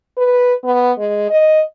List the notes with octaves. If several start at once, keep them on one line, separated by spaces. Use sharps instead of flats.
B4
B3
G#3
D#5